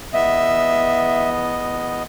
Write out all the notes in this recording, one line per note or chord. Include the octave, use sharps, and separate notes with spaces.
E2 B3 D#5 E5